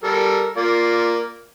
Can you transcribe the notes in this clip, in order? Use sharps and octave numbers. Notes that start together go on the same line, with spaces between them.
G3 A4 A#4
A#3 F4 D5